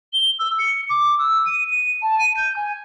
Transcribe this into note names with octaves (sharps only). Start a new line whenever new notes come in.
G7
E6
C#7
D6
E6
D#7
D#7
A5
D#7
G6
G#5